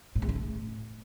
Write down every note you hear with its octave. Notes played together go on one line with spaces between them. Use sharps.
A2
E2
C#3
A2